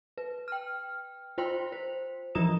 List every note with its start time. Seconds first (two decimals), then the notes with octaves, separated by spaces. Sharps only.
0.18 B4
0.48 G5 F6
1.38 F4 C5 G5 C6
1.72 C5
2.35 E3 F3 F4 A#5 D#6 E7